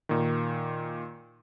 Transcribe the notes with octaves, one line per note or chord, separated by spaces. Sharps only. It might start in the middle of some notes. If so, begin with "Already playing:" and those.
A#2 D#3